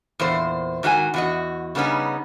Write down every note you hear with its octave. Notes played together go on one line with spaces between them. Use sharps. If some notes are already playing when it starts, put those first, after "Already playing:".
E2 A#2 C5
G#2 D#3 F#4 G#4 G#5
E2 F#4 D#5
C#3 G3 B3 C#4 D#4